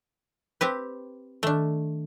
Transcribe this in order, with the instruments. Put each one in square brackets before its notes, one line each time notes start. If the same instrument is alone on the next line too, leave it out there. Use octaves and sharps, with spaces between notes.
[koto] C4 G4 B4
[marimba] D#3 [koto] A3 D4